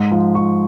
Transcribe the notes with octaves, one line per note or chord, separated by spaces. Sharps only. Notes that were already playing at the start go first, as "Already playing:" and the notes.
Already playing: G#2
F3
F3 C#6